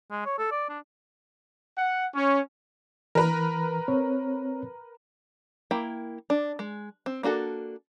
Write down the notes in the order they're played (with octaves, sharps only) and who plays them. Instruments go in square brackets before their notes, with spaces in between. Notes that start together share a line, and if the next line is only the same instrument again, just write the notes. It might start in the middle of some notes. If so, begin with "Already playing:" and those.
[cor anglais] G#3
C#5
A4
D5
D4
[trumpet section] F#5
C#4
[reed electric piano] E3 [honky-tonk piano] A#4 B4 A#5
[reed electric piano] C4 C#5
[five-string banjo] A#3 E4 G5
D4
G#3
C4
A#3 D4 F#4 A4